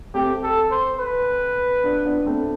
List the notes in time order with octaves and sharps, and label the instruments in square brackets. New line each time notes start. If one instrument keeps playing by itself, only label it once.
[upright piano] A3 C4 [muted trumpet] G4
[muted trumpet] A4
C5
B4
[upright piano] B3 D4
B3 D4
A3 C4